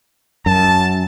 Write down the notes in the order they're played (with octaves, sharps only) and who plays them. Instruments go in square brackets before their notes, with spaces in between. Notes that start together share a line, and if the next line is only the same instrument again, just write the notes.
[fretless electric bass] F#2 [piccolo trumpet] A5